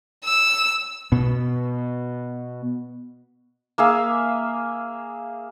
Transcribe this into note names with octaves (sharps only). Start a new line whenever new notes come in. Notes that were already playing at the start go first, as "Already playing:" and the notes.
E6
B2 B3
A#3 G#4 E5 F5